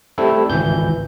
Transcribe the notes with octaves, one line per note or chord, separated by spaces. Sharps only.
G3 A3 C4 E4 A4
G#1 C#2 E3 G6